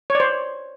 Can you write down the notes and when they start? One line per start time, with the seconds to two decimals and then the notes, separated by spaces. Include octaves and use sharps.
0.10 C#5
0.15 D5
0.20 C5